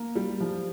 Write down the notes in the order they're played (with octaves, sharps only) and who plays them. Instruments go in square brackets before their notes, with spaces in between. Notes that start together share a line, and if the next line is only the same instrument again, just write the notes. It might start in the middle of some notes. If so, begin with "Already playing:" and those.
Already playing: [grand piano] A#3
G3
F3